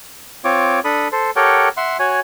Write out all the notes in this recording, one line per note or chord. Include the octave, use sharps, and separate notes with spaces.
C4 F4 C#5 D6
D4 A4 B5 D#6
A4 C5
G4 A4 A#4 C#5 F#5 G5
E5 F#5 C6
F#4 C#5 G#5